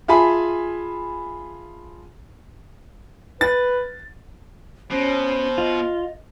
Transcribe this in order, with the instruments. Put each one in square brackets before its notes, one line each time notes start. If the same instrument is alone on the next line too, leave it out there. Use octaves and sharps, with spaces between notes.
[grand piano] F4 G#4 E5 G#5 A5 B5
[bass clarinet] B4 [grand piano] A6
[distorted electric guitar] B2 [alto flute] C#4 [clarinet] C5
[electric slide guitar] F4 [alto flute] D#5